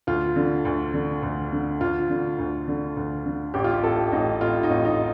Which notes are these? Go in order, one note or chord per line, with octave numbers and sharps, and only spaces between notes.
D2 F4
D3
D2
D3
D2
D3
D2 F4
D3
D2
D3
D2
D3
A1 G4
F4
G4
A2 A4
A1 D#4
A2 F4
D#4
A1
D#4